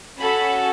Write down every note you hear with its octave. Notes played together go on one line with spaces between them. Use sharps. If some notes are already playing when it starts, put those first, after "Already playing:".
C#4 F#4 A4 B5